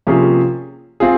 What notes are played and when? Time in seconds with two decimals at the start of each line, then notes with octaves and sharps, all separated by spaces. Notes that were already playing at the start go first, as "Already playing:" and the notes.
0.07 C3 F3 A#3 C#4 G#4
1.00 C4 F4 G#4